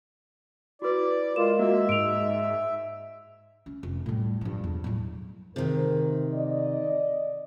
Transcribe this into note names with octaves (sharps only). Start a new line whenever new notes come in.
E4 F#4 B4 D5
G#3 F4 A#4 E7
A#3 F#4 E5
G#2 D7 F7
C#4
F1
A2 G3
G2 F3
E2
A2 F#3
C3 D#3 G#4 A#4 C5
D5 D#5